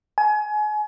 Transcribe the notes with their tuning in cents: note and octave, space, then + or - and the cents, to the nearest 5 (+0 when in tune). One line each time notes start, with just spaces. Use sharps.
G#5 +30